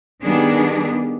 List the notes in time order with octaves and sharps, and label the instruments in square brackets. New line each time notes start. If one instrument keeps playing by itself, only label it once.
[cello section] D#3 G3 B3 D4 G#4